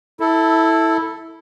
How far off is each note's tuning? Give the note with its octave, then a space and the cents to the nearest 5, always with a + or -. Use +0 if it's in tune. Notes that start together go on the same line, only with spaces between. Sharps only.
E4 -10 A4 +5